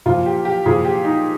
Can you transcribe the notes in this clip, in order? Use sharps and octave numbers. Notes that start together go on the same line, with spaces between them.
A#2 F3 F4
G4
G4
A#2 F3 G#4
G4
D#4